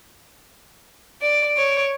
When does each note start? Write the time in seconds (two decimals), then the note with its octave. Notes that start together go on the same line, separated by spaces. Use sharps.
1.22 D5 D7
1.57 C#5